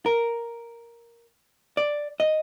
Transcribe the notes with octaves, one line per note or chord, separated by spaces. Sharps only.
A#4
D5
D#5